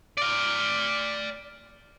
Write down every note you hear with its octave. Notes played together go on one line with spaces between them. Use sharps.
D5 F5